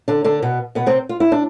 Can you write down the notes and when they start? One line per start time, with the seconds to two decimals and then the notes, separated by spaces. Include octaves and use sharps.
0.08 D3 D4
0.24 D3 D4
0.42 B2 B3
0.75 B2 B3
0.86 C3 C4
1.09 F4
1.20 E4
1.32 D4